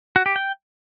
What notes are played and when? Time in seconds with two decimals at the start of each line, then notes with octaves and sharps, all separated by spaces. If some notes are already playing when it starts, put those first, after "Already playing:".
0.16 F#4
0.26 G4
0.36 G5